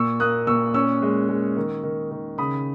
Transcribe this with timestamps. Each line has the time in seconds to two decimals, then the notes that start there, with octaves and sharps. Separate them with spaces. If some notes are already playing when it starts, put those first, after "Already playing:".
Already playing: A#2 C#6 E6
0.20 A#3 D#6 F#6
0.47 A#2 C#6 E6
0.74 C#4 C#6 E6
1.02 G#3
1.29 G#3
1.57 D#3
1.83 D#3
2.11 D#3
2.38 C#3 B5 D#6